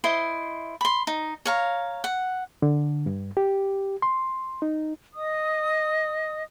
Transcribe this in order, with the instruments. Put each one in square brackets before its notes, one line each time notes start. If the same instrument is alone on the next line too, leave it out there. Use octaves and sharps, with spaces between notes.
[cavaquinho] E4 C5 D#5 C6
B5 C6
D#4
C#5 F5 A#5
F#5
[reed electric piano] D3
G2
G4
C6
D#4
[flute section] D#5 D#6